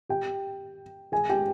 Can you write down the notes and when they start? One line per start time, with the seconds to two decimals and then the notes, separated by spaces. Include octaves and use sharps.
0.09 G4 G5
1.12 G#4 G#5
1.29 G4 G5